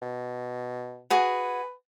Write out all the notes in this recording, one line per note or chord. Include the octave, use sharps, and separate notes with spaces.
B2
F#4 G#4 B4